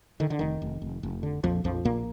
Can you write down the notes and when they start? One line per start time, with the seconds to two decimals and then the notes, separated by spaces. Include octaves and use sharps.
0.20 D3 D#3
0.30 D3
0.39 F1 D#3
0.62 F1
0.82 F1
1.03 F1
1.23 D3
1.44 A#1 F2 F3
1.64 A#1 F2 F3
1.85 A#1 A#2 A#3